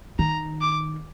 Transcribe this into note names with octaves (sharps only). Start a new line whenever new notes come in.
D#3 A#5
D6